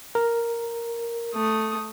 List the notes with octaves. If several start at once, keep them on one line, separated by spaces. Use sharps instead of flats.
A#4
A3 D#6